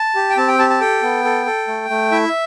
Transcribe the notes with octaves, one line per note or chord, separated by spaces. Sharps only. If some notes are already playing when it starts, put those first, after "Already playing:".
Already playing: A5
G4
G5
C4 A5
G5
G4 A5
A5
A4 G5
B3
A4
A4
A3
A3
E4 E5